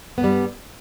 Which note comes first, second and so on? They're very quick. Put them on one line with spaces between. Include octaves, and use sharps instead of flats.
B3 G2 G3